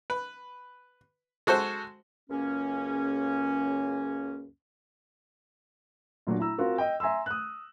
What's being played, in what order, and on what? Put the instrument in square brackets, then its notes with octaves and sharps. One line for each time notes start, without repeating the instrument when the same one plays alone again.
[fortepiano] B4
G#3 F#4 A4 C5
[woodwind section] C#2 F#2 C#3 A#3 C#4
[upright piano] A#2 F#3 D4 F#4
E4 A#5 E6
C4 F4 F#4 A#4
D#5 G5
E5 G#5 A#5 C6 E6
D#6 F#6